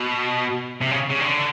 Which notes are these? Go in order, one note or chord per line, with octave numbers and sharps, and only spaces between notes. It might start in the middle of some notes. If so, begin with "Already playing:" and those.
Already playing: B2
C3
C#3
C#3
D3